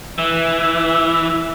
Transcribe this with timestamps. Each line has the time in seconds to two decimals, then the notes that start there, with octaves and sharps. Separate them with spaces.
0.19 E3 E5